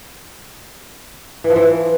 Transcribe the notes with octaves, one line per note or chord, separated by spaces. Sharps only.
E3
F3
E3